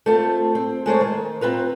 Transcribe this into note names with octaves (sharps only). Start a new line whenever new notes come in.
A3 C4 F4 A4
C4
G#3 A3 C5 C#5
D#3
C4 F4 B4 A#5